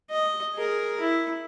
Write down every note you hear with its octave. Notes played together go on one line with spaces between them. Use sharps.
D#5
G#4 A#4
E4